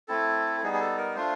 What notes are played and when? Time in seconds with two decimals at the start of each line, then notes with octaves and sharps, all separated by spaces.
0.08 A3 C4 E4 A4
0.63 G3 B3 D#4 G#4
0.73 G#4
0.80 A4
0.98 A#4
1.16 A3 D4 F4 C5